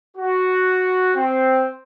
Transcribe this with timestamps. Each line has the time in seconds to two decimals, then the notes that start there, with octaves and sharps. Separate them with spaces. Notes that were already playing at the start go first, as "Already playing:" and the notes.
0.16 F#4
1.14 C4